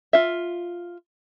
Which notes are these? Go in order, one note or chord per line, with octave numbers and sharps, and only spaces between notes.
F4 E5